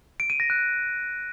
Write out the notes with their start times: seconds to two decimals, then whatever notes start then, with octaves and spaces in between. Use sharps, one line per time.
0.20 D7
0.30 D#7
0.40 A#6
0.50 F#6